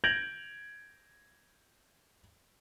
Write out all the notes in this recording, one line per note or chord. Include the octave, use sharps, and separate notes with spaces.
G6 G#6 A#6 D7 F7 F#7